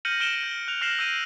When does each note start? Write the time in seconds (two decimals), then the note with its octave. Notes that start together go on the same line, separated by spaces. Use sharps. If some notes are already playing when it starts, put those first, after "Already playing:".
0.05 F6 G6 A#6 C#7 D#7 F#7
0.20 F6 D7 E7 G7
0.43 G6
0.68 F#6 F7
0.81 F6 A#6 C7 E7 F#7
0.99 E6 G6 D7 D#7 F#7